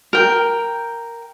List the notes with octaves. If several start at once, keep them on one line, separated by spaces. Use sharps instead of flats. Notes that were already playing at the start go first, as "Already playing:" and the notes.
A#4 G5